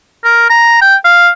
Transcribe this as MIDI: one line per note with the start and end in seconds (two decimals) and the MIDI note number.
0.24 0.50 70
0.50 0.80 82
0.82 0.96 79
1.05 1.30 77